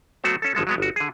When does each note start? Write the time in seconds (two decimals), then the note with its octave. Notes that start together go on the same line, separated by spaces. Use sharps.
0.24 F#3 A3 B3 F#4 C5
0.42 C#4 A4
0.55 G1 F3 G#3 A4
0.67 F#3 G#3 B3
0.78 G1 F#4
0.96 D3 G#4